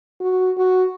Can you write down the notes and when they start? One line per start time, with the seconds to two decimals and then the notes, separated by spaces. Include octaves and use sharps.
0.21 F#4
0.57 F#4